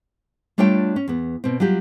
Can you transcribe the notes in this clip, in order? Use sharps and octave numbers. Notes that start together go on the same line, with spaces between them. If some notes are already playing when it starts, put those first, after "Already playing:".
G3 A3 D4 F4 C#5 G5
C#4
E2 B3
B2 C4
F#3 G3 F4 G4